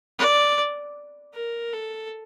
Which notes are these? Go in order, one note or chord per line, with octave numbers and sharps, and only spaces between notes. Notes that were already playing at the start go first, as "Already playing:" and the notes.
D5
A#4
A4